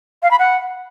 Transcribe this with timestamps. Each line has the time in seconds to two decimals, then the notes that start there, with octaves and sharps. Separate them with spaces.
0.23 F5
0.31 B5
0.39 F#5